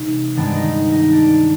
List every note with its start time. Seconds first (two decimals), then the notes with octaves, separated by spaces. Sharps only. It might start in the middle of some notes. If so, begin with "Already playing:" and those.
Already playing: C3 E3 G#3 D#4
0.36 G2 D#3 G#3 B3 D4
0.56 D#4
0.92 D#4
1.12 D4